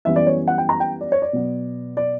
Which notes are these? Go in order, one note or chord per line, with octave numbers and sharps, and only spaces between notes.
F#2 E3 G3 B3 E5
D5
C#5
F#5
G5
A#5
G5
D5
C#5
D5
B2 F#3 B3
D5